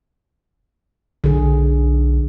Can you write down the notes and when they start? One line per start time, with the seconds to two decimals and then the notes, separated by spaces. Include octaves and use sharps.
1.24 B1 D3 G#4